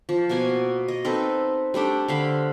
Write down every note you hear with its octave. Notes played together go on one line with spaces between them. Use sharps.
F3
B2 A#3 F#4 G#5
D#5
C4 D#4 A4 B4
G3 A3 D4 G5
D3 C5 F5 B5